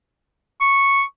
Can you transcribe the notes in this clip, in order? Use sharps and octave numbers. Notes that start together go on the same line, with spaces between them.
C#6